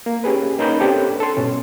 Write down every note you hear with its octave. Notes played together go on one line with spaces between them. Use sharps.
A#3
C#4 G4 G#4 B4
A#3 C#4 D#4 A#4 B5 G6
C4 D4 G4 A4 B4 C#5
A4 C6
G2 B2 C#4